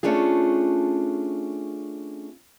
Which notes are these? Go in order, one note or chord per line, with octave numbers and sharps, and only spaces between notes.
A3 C#4 D4 F4 G#4